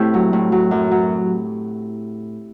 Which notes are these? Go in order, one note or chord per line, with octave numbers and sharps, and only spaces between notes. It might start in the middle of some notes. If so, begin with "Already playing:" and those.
Already playing: A2 C4 E4 G4
F#3
A2
F#3
F#2
F#3